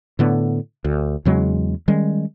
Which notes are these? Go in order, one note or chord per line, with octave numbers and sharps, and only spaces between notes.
A2 D3 B3
D2
E2 C#3 F#3 G#3
D#3 G3 G#3 C#4